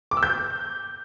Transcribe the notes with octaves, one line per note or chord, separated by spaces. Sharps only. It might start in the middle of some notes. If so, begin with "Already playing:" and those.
D6
E6
G6